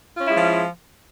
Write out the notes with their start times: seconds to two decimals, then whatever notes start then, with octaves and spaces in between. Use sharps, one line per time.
0.15 F4
0.20 C#4
0.25 E4
0.30 G#3
0.35 F3